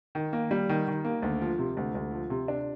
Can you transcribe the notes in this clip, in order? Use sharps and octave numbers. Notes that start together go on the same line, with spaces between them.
D#3
A#3
G3
D#3
D#3
A#3
D2
F3
C3
D2
D2
F3
C3
D4